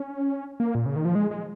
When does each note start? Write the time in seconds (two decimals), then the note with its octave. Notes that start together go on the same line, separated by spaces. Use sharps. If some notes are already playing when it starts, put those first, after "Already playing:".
Already playing: C#4
0.60 A#3
0.75 A#2
0.86 C#3
0.96 D#3
1.05 F3
1.15 G#3
1.31 G#3